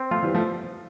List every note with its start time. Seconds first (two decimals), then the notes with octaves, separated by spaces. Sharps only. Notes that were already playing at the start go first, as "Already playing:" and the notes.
Already playing: C4
0.11 F3 A3 F4
0.23 E3 G3
0.34 F3 A3